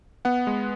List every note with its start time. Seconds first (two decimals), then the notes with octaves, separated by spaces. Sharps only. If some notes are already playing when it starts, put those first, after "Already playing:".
0.25 B3 F#5
0.47 G#3